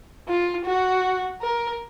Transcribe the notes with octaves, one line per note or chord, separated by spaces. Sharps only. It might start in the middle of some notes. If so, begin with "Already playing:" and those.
F4
F#4
A#4